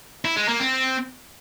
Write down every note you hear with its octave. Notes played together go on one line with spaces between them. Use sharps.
E4
G#3
A#3
C4